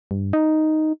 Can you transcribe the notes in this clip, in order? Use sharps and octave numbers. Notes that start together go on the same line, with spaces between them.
G2
D#4